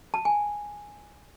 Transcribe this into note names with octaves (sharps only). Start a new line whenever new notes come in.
A5
G#5